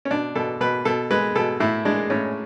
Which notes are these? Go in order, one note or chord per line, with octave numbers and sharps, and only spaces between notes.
C#4
B2 D4
B2 A4
B2 B4
B2 A4
G#3 B4
B2 A4
A2 E4
G#3 D4
A2 C#4